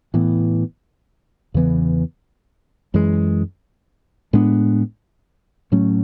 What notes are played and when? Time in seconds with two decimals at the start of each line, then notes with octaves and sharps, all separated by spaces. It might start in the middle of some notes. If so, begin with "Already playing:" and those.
0.14 A2 E3 B3
1.54 E2 C#3 E3 B3
2.94 F#2 E3 G#3
4.33 A2 G#3 B3 D4
5.72 A2 F#3 A3 C#4